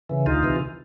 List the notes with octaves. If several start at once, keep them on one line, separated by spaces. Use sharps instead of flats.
C#3 E3
D2 D#4 F4
C3 E3